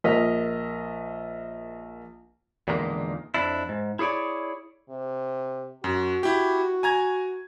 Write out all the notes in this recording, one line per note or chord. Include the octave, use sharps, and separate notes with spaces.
A#1 A#4 D#5 F6 B6
E2 A#2 D3 D#3 G#3 A#3
F2 D4 E4
G#2
E4 G#4 C#5 D5
C3
F#2 F#4
E4 G4
G#5 A#5 G#6